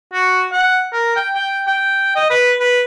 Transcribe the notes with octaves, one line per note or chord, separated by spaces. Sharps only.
F#4
F#5
A#4
G5
G5
G5
D#5
B4
B4